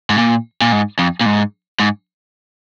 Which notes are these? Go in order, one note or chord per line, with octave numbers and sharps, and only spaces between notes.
G#2
A#2
A#2
G#2
F2
A#2
G#2
G#2